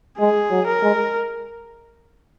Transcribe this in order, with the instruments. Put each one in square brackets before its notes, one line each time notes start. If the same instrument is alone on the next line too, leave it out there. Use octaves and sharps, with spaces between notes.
[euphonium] G#3 [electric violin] G#4
[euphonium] F#3
[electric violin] A#4
[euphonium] G#3